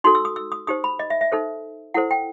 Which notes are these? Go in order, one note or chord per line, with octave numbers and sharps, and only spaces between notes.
D#4 F#4 A4 C6
E6
D#6
E6
D#6
D#4 G4 C5 D#6
B5
D#5
E5
E5
D#4 A4 C5
E4 A4 C5 F#5
G5